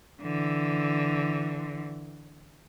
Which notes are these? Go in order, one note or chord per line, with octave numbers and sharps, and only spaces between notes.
D3 E3